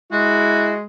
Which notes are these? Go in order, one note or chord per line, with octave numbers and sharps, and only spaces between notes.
G#3 E4 F#4